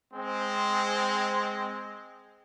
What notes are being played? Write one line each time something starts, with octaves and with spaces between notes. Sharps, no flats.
G#3 C4